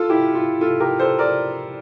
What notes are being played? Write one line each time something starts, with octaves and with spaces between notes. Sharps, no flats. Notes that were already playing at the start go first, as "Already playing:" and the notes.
Already playing: F4 A4
E4 G4
F4
F4 A4
G4 A#4
A4 C5
A#4 D5